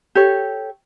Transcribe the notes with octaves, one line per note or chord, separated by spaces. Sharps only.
G4 A4 C#5